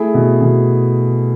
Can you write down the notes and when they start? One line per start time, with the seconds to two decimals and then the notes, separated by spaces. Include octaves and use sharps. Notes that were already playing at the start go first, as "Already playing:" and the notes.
Already playing: A3 E4 G#4
0.14 B2
0.41 B2